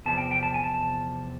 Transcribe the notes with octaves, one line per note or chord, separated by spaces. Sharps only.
E2 C3 F3 A5
G5
G5
A5
G#5
A5